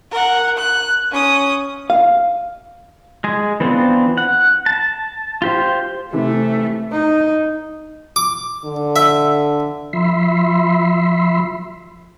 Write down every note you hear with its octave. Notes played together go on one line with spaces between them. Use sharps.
A#4 F#5
F#6
C#4 D#6
F5
G#3 G#4
E3 B3 C4 D4 F4
F#5
A5
F4 G4 C5
C3 E3 A3
D#4
D6
D3
E5
F3 E5 B5 C6